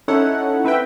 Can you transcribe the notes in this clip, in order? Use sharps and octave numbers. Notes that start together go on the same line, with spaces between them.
C#4 D#4 E4 A4 C#5 F#5
C4 B4 E5 G5